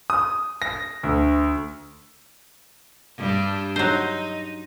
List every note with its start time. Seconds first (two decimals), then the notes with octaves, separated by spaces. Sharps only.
0.10 D#6
0.62 A#6
1.03 D2
3.17 G2 G3 D4
3.76 F#3 D#4 C5